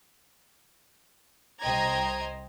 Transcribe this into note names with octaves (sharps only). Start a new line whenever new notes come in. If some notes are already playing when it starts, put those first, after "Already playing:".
C2 C5 D#5 G5 A#5 G#6